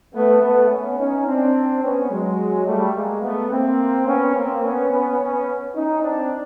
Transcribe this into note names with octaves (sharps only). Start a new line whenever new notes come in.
A3 B3
A3 B3
B3 C#4
C#4 D#4
C4 D4
B3 C#4
F#3 G#3
G3 A3
G#3 A#3
A3 B3
A#3 C4
B3 C#4
A#3 C4
B3 C#4
B3 C#4
B3 C#4
C#4 D#4
C4 D4